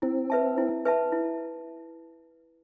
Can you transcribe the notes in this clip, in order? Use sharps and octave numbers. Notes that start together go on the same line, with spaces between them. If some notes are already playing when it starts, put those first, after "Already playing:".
C4 E4
B4 E5 A5
E4
B4 E5 A5
E4